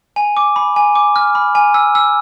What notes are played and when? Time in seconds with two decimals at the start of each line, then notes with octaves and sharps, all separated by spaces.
0.16 G#5
0.37 D6
0.56 B5
0.76 G#5
0.95 D6
1.16 F6
1.35 B5
1.55 G#5
1.74 E6
1.95 E6